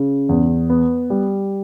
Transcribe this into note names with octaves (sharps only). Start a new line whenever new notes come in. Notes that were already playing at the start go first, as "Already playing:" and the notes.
Already playing: C#3
E2
B3
G3